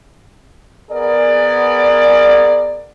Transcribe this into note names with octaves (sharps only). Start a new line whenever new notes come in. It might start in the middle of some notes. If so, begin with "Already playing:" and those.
B3 G#4 A#4 D5